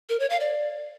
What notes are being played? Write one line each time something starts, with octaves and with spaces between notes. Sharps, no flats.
A#4
C#5
F5
D5